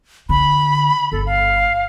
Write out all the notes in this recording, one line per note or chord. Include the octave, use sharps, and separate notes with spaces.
D3 B5
G1 A4
F5